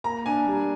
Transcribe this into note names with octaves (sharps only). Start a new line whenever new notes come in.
A#3 A#5
D4 G#5
G3